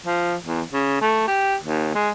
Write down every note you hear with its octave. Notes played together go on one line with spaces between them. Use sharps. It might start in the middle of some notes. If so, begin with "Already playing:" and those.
F3
E2
C#3
A3
G4
D#2
G#3